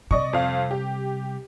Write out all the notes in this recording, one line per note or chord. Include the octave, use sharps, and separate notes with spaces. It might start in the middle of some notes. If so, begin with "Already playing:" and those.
C3 G3 D5 D#5 C#6
F2 F5
G4